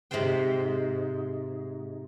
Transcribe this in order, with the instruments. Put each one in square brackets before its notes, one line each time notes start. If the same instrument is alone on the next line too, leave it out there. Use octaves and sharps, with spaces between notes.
[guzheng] G#2 C3 F4 C5 G5